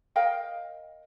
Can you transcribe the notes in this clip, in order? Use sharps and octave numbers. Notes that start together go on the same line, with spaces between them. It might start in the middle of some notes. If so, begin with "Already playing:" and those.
A#4 D#5 F5 G5